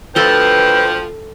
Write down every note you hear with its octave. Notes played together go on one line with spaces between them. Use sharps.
D2 F3 A4 B4 G5 C6